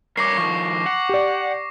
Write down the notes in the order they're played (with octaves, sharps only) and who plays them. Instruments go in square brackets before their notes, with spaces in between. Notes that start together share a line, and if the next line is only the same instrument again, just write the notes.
[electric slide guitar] G2 A#4 C#5 [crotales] D6 A#6 C7
[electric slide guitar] D#3 F3 [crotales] C#6
[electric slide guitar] F#5
[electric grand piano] G4 D5